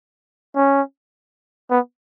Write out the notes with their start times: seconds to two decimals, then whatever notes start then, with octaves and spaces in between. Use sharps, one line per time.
0.56 C#4
1.70 B3